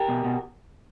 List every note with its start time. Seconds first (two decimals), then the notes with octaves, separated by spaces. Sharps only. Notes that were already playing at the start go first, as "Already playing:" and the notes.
Already playing: G4 A#4
0.08 B2
0.24 B2